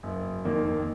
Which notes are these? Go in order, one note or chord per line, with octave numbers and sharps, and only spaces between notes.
F#1
F2 D#3 A#3